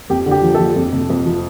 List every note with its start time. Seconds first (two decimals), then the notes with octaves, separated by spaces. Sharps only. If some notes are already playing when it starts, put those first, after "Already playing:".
0.10 F2 G4
0.26 D3
0.31 G4
0.42 F3
0.55 F3 A4
0.76 F2
0.93 C3
1.10 F2
1.26 F3